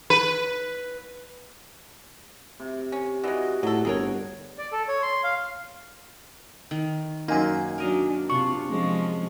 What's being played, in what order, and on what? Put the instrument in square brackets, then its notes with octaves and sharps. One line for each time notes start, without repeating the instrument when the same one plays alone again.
[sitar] B4
[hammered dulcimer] C3
[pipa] C#4
[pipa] E3 G#3 [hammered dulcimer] F#4 D5 D#5
[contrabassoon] A2 [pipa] F#3 A4
[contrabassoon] G1 [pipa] G#4 A#4 C#5
[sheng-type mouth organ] D5
A4
C#5
C6
F5
[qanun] D#3
[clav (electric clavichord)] F#2 A#3 [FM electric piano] D#4 G#5 [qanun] C5
[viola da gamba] F#3 D4 [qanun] A#4 D#5 F5
[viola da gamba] C3 F4 [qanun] D4 [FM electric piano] C#6
[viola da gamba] F3 G#3 C#4